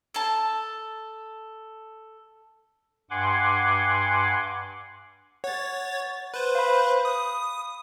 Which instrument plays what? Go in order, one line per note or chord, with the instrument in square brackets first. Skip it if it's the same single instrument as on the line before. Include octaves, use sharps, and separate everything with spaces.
[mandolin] A4 A5
[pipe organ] G2 F#5 G#5 C6 D6
[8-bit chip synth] C#5 A6 [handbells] F#5
[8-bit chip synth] B4 C5
[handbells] F5 B5
[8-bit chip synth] D#6